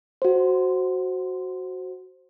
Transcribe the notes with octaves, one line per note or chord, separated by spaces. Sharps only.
F#4 C5